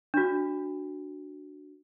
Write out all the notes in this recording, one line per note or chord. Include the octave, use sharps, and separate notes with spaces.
D4 F#4